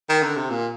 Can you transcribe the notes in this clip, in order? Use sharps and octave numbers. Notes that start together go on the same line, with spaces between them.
D#3
D3
C3
A#2